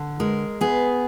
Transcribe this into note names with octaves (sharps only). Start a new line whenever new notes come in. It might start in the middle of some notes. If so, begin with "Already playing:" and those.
Already playing: D3
G#3 A#4
B3 G#4